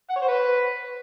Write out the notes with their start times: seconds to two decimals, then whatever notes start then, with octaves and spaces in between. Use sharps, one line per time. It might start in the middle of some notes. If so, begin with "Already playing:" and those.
0.10 F#5
0.16 C#5
0.22 C5
0.28 B4